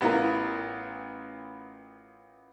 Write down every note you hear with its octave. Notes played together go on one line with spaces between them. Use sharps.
A1 B3 E4 F4 A#4